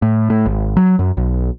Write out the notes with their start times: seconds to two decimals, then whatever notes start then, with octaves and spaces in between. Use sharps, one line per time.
0.02 A2
0.30 A2
0.46 G#1
0.77 F#3
0.99 F#2
1.17 B1